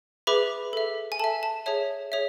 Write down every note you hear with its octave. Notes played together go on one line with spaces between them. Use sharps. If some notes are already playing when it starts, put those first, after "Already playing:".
G#4 B4 E5 B5 D6
A4 E5
G#5
A4 E5 A5
A5
G#4 C#5 E5 A5
G#4 C#5 E5